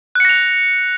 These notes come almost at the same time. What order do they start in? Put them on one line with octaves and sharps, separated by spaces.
F#6 C#7 A#6 F7